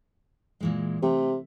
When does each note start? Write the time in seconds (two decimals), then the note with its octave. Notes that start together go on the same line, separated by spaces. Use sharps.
0.61 A#2 E3 G#3
1.03 C3 A3